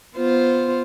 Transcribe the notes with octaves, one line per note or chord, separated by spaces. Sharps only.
B3 F4 C5